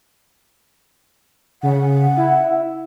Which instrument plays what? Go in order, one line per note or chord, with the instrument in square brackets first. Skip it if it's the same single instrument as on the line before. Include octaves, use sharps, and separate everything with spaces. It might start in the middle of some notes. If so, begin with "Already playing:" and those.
[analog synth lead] C#3 [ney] F#5
[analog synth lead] E4